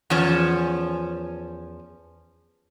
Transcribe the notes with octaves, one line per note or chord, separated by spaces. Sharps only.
E2 F3 C#4